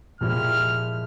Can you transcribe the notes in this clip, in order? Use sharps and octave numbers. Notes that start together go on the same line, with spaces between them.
A#2 F3 G#3 E4 G4 F6